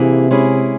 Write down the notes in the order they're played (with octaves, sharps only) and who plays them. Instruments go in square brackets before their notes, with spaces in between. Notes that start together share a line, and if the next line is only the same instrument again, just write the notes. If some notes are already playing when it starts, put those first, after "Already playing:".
Already playing: [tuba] C3 [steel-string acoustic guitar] E3 A#3 E4 G#4
[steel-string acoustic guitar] G#3 C#4 E4 G#4